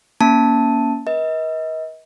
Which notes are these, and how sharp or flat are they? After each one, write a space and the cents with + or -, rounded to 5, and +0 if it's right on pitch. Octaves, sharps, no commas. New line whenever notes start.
A#3 +10 C#4 +10 A5 +0
B4 -45 D#5 +35